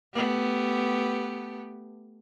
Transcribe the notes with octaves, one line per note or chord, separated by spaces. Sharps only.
A3 B3 G4